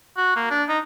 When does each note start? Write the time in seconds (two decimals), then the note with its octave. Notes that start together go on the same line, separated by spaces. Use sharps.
0.17 F#4
0.36 A#3
0.50 D4
0.69 D#4